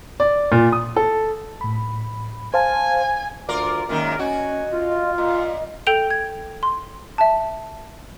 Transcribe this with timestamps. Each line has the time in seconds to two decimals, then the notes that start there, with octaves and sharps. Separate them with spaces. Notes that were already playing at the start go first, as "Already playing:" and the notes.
0.20 D5
0.52 A#2
0.72 D#6
0.96 A4
1.61 A2 B5
2.54 C5 F5 G#5 A5
3.49 D2 F4 A#4 D5 D6
3.89 F#2 A#2 D#3 G#3 A#3 A#4
4.19 C#4 F#4 D#5 G#5
4.73 F4
5.18 A#2 D#5
5.87 A4 G5 G6 D7 F7 G7
6.10 G#6
6.63 C6
7.18 E5 A5